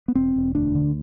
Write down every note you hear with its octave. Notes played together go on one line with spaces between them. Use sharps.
B3
E1 C4
E1
D2 D4
D3